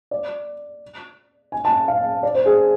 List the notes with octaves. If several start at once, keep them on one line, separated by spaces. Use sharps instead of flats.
D5
G#5
A5
F5
D5
C5
G#4